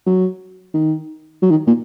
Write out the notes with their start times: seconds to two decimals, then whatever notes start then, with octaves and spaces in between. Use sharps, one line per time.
0.07 F#3
0.74 D#3
1.42 F#3
1.51 D#3
1.67 A#2